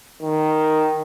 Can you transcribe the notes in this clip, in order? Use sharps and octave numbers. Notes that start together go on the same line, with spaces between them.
D#3